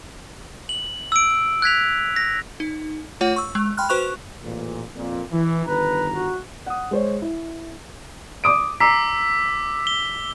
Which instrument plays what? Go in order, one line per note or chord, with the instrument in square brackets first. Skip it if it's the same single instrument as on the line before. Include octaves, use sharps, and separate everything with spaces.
[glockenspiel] F#7
E6 D7
F#6 G#6 B6 F7
A#6
[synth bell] D#4
A3 F4 C#5 F#5
C#6 E6
G#3
G5 B5 C6 F6 F#6
F#4 B4 C5 C#6 F#6 F7
[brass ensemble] A1 A#2
F2 A#2
E3
[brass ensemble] G1 D#3 A#5 [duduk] B4
[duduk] F#4
[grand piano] F#5 D#6
G#3 C5 C#5
E4
[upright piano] D6 D#6 D7
[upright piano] A#5 C7 [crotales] D6 E6 B6
[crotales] G7